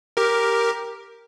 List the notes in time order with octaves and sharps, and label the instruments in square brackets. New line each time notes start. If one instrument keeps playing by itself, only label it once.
[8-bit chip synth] G4 A#4